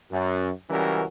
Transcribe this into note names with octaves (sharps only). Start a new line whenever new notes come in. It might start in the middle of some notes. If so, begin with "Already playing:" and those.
F#2
C#2 E3 G3 C#4 F#4 A#4